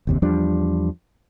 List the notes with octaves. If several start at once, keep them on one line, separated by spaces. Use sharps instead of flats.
F#1 D#2 C3
E2 F3 G3 D4